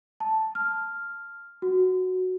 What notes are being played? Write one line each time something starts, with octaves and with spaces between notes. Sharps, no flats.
A5
F6
F#4